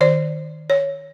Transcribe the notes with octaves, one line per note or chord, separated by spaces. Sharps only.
D#3 C5 D5
C#5